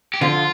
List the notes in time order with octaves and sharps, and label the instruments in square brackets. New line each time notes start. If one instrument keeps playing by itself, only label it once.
[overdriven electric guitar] G4
[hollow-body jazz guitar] D3 F3 [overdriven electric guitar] F4